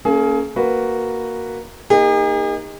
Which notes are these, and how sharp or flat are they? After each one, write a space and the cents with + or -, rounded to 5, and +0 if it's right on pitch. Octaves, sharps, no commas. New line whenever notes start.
A#3 -20 C#4 +0 G#4 +30
A#3 +0 F#4 +0 B4 +0
A#3 +0 D#4 +0 G#4 -45